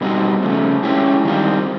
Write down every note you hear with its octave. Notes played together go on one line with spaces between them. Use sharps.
B2 G3 C4 D#4 F#4
C#3 F3 A3
G#3 C#4 E4 G4
D#3 G3 C4 F4